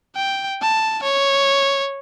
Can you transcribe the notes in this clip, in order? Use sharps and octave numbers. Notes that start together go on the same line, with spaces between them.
G5
A5
C#5